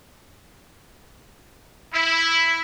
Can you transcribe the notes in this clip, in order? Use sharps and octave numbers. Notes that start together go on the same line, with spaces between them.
E4